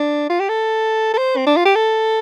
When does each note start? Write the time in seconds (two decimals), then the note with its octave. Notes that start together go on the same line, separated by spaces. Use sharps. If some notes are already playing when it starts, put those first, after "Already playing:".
Already playing: D4
0.30 F4
0.40 G4
0.49 A4
1.13 A4
1.17 C5
1.36 C4
1.46 D4
1.57 F4
1.65 G4
1.75 A4